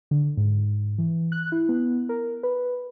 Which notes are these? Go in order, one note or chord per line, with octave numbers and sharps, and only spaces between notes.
D3
G#2
E3
F#6
E4
B3
A#4
B4